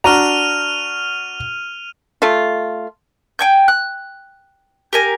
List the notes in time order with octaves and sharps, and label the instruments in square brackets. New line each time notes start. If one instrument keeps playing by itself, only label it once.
[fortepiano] D4 F#4 A#5 [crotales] F6 D#7 F7
[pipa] A3 F4
[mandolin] G5 G#5 G6
F#6
G4 A#4 G#5